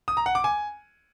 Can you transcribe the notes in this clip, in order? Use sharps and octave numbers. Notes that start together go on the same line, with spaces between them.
D#6
A#5
F#5
D6
G#5